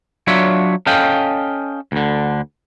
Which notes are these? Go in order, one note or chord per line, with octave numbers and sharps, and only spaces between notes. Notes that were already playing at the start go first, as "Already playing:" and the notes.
F#3 D4 F4 C#5 E5
C#4 A4 D#5 F5 G5
D2 D3